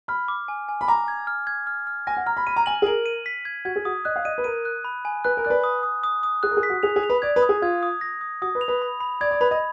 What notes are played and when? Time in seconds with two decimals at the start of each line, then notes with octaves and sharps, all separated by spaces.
0.08 B5 F6
0.28 D6
0.48 G#5
0.69 G#5
0.81 B5
0.88 A#5 D6
1.08 G#6
1.27 F6
1.47 G#6
1.67 F6
1.87 F6
2.07 G#5 A#6
2.17 F#5
2.26 A#5 F6
2.37 B5
2.47 B5 D#7
2.56 A#5
2.66 G#5 F#7
2.82 G#4
2.87 A#4 F#7
3.06 D#7
3.26 B6
3.45 G#6
3.65 F#4 G#6
3.76 G#4
3.85 F#4 D#6
4.05 D#5 F#6
4.16 F5
4.25 D#5 D#7
4.38 B4
4.44 A#4 D#7
4.65 F#6
4.85 B5
5.05 G#5
5.24 B4 F#6
5.37 A#4
5.45 D5 F#6
5.50 B4
5.64 D#6
5.83 D#6
6.04 D#6
6.23 D#6
6.43 G#4 F#6
6.51 A#4
6.57 G#4
6.63 B6
6.70 F#4
6.83 G#4 F7
6.96 G#4
7.03 F7
7.10 B4
7.22 D5 G#6
7.36 B4
7.42 D#6
7.49 G#4
7.62 F4 G#6
7.83 D#6
8.01 A#6
8.21 D#6
8.42 F#4 D#6
8.55 B4
8.61 F7
8.68 B4
8.82 B5
9.00 B5
9.21 D5 G#6
9.31 D5
9.41 B4 B5
9.51 D#5